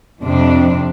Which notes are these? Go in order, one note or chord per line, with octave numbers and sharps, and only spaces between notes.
F2 C3 D4